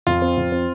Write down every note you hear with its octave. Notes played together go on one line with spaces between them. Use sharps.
F2 F4
C4
F2
C4